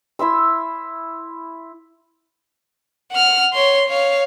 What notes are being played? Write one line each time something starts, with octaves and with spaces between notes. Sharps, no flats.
E4 E5 C6 E6
F#5 F6
C#5 C6
C#5 F5